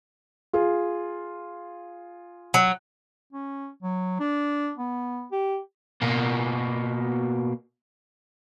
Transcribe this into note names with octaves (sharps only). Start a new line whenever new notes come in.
F4 G#4
F#3
C#4
F#3
D4
B3
G4
B2 A#3